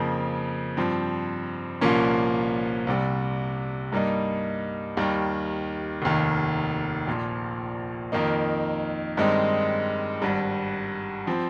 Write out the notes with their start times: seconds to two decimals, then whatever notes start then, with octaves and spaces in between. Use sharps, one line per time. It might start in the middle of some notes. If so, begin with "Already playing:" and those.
Already playing: F2 C#3 F3 A#3
0.77 G2 F3 C4
1.81 C2 A#2 F3 A#3 C#4
2.87 C2 C3 G3
3.92 G2 G3 A#3 D#4
4.97 D#2 D#3 G3
6.02 F1 D#2 D#3
7.07 A#1 A#2 F3
8.12 F2 D#3 A#3 D#4
9.17 G2 D#3 G#3 C4 D#4
10.22 G#1 G2 G3
11.27 F3 C4